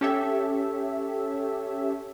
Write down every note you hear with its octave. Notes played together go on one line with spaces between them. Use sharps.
C#4 G4 A4 C#5 E5